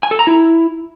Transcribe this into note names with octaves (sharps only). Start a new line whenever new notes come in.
G#5
A4
A#5
E4